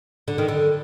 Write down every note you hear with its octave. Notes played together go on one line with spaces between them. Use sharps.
D3
D#3
D3